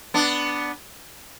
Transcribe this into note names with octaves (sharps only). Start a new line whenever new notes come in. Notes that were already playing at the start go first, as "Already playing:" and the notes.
B3 D4